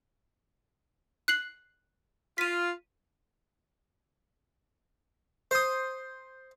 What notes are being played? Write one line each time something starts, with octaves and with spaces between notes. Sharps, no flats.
F#6 C7 F#7
F4 B6 D#7
C5 D#6